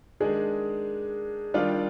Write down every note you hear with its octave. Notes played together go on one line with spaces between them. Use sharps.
D#3 G#3 D4 G#4
D#3 G3 D4 F4